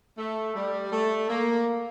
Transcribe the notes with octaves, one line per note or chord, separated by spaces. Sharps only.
A3
G3
A3
A#3